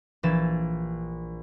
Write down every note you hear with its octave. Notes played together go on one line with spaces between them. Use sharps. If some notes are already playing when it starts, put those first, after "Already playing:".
A#1 E3 A6 E7